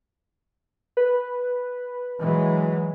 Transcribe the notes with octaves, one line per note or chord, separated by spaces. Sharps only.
B4
E3 F#3 G#3